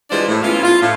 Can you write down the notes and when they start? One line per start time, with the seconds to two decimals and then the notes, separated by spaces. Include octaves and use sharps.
0.11 E3 G3 G#3 D4 F4 C5
0.28 A2
0.43 B3 C#4 E4 F4
0.63 F4
0.81 A2